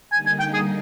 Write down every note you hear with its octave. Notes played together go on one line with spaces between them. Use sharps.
D3 G3 A#3 D#4 G#5
G#5
G5
G#4